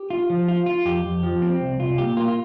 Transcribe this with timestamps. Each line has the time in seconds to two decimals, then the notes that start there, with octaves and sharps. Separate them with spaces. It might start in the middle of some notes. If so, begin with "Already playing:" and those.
Already playing: G4
0.10 F4
0.30 F3
0.48 F4
0.66 F4
0.85 F2 G4
1.04 F2
1.23 F3
1.42 C4
1.61 C2
1.80 C2 F4
1.98 A#2 G4
2.17 A#3 F4
2.28 F4